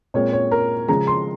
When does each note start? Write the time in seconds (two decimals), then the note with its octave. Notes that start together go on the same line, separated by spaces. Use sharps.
0.14 A#2 G#3 C4 C#5
0.33 C#5
0.51 A#4
0.88 C#3 F3 G#3 A#5
1.07 C6